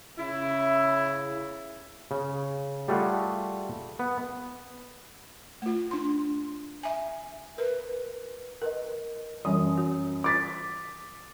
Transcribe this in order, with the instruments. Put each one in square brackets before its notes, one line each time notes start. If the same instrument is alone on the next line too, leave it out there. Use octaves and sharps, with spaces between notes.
[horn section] C#3 E4
[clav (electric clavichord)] C#3
G3 A3 F4 F#4 G#4
B3
[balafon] A3 F4
D4 C6
E5 G#5
[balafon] A#4 [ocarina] B4
[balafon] A#4 B4 D#5
[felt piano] F#2 D#6 [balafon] E3 G3
[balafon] F#4
[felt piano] D6 A6 B6